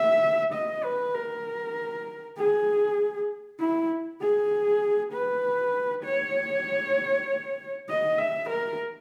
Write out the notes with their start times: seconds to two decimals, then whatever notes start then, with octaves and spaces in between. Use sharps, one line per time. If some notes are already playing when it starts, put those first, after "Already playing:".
Already playing: E5
0.53 D#5
0.84 B4
1.14 A#4
2.37 G#4
3.59 E4
4.21 G#4
5.12 B4
6.04 C#5
7.89 D#5
8.18 E5
8.50 A#4